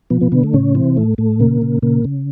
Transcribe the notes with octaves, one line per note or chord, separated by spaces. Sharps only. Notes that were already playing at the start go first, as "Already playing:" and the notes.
B2 F3 B3
B2 B3
B2 D3 B3
A3
A2 C#3 C#4
C3 E3 C4
A2 A3
A2 A3
A#2 C#3 A#3
C#3
A#2 C#3 A#3
C#3